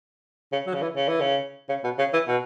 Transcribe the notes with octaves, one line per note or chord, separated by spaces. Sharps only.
C#3
F#3
C#3
E3
C#3
E3
C#3
C#3
B2
C#3
E3
B2